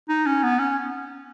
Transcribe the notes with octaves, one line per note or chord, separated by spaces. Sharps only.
D#4
C#4
B3
C#4